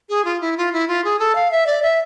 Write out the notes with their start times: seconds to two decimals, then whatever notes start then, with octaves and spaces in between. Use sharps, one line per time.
0.09 G#4
0.25 F4
0.41 E4
0.57 F4
0.73 E4
0.88 F4
1.04 G#4
1.19 A4
1.35 F5
1.52 E5
1.67 D5
1.82 E5